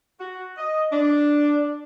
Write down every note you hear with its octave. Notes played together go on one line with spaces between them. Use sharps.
F#4
D#5
D4